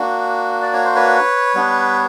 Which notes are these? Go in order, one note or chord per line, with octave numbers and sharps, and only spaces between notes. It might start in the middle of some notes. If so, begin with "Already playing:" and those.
Already playing: A#3 D4 F#4
D5
C#5
C5
B4 C#5
G3 B3 D4